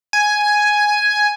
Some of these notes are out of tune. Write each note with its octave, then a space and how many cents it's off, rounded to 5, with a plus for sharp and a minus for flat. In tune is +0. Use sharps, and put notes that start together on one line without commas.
G#5 +5